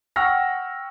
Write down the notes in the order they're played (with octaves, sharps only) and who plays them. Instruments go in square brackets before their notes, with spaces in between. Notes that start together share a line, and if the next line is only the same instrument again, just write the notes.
[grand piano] F#5 G5 C#6 E6 F6 A#6